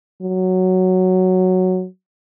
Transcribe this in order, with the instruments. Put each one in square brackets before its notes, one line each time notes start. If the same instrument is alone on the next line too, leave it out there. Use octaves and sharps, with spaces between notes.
[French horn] F#3